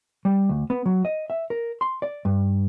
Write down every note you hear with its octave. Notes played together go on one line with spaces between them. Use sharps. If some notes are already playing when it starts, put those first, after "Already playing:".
G3
D2
B3
F#3
D#5
E5
A#4
C6
D5
G2